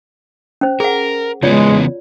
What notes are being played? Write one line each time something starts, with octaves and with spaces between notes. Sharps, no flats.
C#4 C5
G#4 A#4 F#5
C#3 E3 G#3 B3 F4 C#5 D5